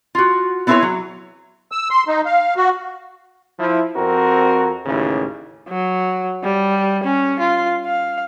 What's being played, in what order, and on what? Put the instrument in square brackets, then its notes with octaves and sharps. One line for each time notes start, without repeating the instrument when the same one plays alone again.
[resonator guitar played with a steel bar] F4 F#4
B3 C4 E4 G#4 B4 C#5
F#3
[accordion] E6
C6
D#4
F5
F#4
[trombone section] F3 E4
F2 C4 F#4 A#4
A1 D#2 C#3 E3
[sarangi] F#3
G3
C#4
F4
F5